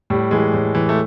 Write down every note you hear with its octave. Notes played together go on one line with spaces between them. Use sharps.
A2 G3
E3 G#3
A2
E3
A3